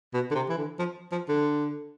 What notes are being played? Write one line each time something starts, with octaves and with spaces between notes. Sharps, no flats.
B2
D3
C3
E3
D3
F3
F3
D3